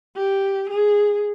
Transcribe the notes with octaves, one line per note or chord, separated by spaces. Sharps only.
G4
G#4